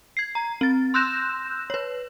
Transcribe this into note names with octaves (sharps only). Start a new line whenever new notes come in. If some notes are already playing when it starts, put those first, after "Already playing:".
G#6 C7
A#5
C4 A6
C6 E6 F#6 G6 A#6 E7
B4 C#5